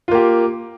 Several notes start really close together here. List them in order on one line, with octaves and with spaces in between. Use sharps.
F4 A#3 G4